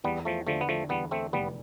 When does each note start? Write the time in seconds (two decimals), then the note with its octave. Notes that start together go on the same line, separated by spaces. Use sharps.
0.04 E2 G3 B3
0.25 F3 A3
0.47 D3 F3 A3
0.61 B3
0.69 F3 A3
0.89 E2 G3 B3
1.11 A3 C4
1.33 F1 G3 B3